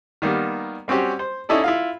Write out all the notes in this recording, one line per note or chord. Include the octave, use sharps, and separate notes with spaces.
D#3 G3 A#3 B3
G3 C4 C#4 F#4 G4
C5
C#4 D#4 E4 A4 D5
E4 F4 F5